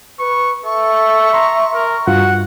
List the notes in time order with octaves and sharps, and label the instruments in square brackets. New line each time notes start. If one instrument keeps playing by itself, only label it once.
[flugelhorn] B4 [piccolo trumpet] C#6
[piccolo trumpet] A4 [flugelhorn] E5 [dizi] C#6
[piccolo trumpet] A#5 [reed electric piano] C6
[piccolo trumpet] A#4
[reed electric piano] G2 F4 [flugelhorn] F#4 [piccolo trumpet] F#5